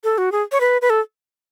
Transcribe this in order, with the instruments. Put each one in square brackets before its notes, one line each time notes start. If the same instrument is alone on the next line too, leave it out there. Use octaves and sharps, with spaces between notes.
[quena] A4
F#4
G#4
C#5
B4
B4
A4